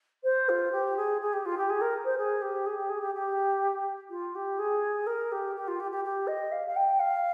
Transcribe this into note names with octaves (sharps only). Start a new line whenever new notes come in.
C5
F4
G4
G#4
G#4
G4
F4
G4
G#4
A#4
C5
G#4
G4
G#4
G4
G#4
G4
G4
F4
G4
G#4
A#4
G4
G4
F4
G4
G4
G4
D#5
F5
F5
G5
F5